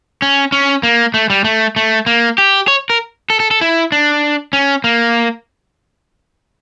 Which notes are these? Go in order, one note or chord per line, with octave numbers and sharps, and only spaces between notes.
C#4
C#4
A#3
A3
G3
A3
A3
A#3
G4
C#5
A#4
A4
A4
A4
E4
D4
C#4
A#3